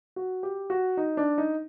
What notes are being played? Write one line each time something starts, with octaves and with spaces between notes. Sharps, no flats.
F#4
G4
F#4
D#4
D4
D#4